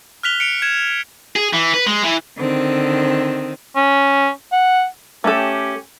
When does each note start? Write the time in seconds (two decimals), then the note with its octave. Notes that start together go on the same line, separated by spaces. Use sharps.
0.23 F6 F#6 B6 F7 G7
0.40 C#7 D7 F7
0.62 G#6 E7
1.36 G#4
1.53 E3
1.74 B4
1.87 G#3
2.04 E3
2.38 D3 D#3 C4
3.76 C#4
4.52 F#5
5.24 A3 C#4 G4 A4